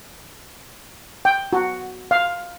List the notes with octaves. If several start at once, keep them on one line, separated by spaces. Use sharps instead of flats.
G5
F#4
F5